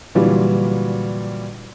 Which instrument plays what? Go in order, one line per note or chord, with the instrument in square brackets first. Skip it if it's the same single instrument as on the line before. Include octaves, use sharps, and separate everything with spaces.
[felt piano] A#2 D3 E3 F#3 G3 F4